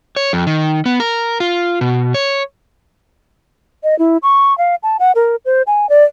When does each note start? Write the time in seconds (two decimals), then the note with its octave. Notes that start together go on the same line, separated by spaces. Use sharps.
0.16 C#5
0.33 F2
0.47 D#3
0.86 B3
1.00 A#4
1.40 F4
1.81 B2
2.14 C#5
3.84 D#5
3.99 E4
4.23 C#6
4.58 F5
4.83 A5
4.99 F#5
5.15 A#4
5.45 C5
5.67 G#5
5.89 D5